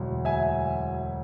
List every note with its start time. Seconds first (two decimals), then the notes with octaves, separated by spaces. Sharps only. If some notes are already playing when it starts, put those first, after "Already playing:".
Already playing: E1 D2 F#3
0.25 E5 G#5